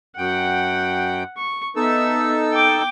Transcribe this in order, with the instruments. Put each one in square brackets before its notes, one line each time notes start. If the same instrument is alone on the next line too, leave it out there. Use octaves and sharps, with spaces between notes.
[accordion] F#2 G5 [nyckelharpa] F#5
[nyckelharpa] C#6
[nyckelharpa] B3 E5 [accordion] D#4 A4 E6
[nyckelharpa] G5 D6